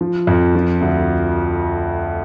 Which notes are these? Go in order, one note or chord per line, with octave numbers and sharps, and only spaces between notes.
F3
F2
F3
D2